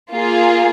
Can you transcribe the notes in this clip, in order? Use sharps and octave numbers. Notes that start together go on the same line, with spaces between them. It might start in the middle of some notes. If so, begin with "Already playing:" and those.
A#3 F4 G#4